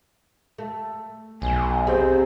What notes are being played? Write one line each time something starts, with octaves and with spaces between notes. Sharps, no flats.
A3
B1 G#5
C3 C4 G#4 C5